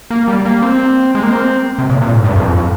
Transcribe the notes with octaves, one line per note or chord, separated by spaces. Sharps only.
A#3
G3
A#3
C4
G#3
A#3
C4
C3
A#2
A#2
G#2
G2
F2